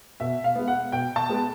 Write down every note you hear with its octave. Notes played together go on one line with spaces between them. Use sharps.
B2 E5
F5
G#3 B3
F#5
B2 G5
A5
G#3 B3